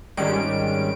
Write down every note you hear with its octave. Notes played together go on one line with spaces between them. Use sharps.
G#1 D#3 G3 G#3 C#4 D7